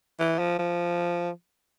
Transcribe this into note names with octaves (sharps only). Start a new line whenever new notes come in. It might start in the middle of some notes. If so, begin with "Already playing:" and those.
E3
F3
F3